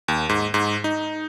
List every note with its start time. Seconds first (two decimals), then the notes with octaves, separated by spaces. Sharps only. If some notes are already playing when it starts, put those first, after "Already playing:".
0.08 D#2
0.29 G#2
0.54 G#2
0.84 D#4